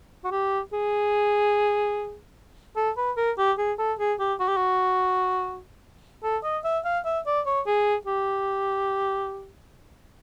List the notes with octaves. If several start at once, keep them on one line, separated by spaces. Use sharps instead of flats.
F#4
G4
G#4
A4
B4
A#4
G4
G#4
A4
G#4
G4
F#4
G4
F#4
A4
D#5
E5
F5
E5
D5
C#5
G#4
G4